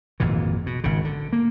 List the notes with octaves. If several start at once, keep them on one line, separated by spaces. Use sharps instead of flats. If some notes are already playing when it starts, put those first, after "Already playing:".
G#1 F2 A#2 E3
B2
G#1 C#3
D3
A#3